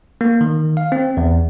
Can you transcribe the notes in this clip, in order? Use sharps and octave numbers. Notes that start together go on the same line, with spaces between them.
A#3
D#3
F5
C4
E2